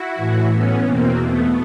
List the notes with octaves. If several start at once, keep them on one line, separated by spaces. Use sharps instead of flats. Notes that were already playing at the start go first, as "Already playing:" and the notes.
Already playing: E4 F#4
A2 E3
B3 C#4
E2 B2 A#3 C4
A3 B3